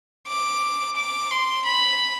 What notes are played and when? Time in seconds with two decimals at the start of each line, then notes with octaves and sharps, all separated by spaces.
0.28 D6
0.97 D6
1.31 C6
1.66 B5